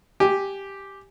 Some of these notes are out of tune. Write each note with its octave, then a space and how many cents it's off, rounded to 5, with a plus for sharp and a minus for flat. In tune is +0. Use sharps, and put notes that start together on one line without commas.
G4 +0 G#5 +0